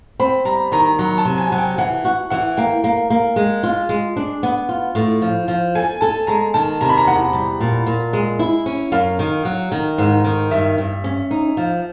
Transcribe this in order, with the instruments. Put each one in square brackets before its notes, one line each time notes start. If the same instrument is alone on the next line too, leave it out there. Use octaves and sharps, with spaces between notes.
[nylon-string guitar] C4 [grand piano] B5
[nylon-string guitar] G3 [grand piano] A#5
[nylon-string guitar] D#3 [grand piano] A#5
[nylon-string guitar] F#3 [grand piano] A#5
[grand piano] A5
[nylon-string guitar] C3
[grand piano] G#5
[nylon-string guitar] F#3 [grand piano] G#5
[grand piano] G5
[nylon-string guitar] E3 [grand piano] F#5
[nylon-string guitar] F#4
[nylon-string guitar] E3 [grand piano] F#5
[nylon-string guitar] A#3 [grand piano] G5
[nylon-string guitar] A#3
A#3
G#3
F4
G#3
D4
B3
F4
A2
F3
F3
[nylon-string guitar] A4 [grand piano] G#5
[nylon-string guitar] A4 [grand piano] A5
[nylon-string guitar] G#3 [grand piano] A#5
[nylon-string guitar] D#3 [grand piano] A5
[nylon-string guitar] C3 [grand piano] A#5
[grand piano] B5
A#5
[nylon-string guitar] E2 [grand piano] F#5
[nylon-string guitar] G3
A#2
A#2
G#3
E4
C#4
[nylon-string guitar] F#2 [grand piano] F5
[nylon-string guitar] D#3
F#3
D#3
G#2
D#3
[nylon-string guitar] G2 [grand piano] E5
[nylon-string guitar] G2
C#4
D#4
F3